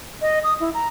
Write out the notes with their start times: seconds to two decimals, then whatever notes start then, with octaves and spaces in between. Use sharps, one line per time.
0.22 D#5
0.44 D#6
0.60 E4
0.74 A#5